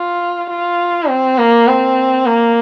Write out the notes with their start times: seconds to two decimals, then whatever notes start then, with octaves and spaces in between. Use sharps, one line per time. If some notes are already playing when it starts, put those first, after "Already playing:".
Already playing: F4
0.50 F4
1.08 C4
1.38 A#3
1.67 C4
2.26 A#3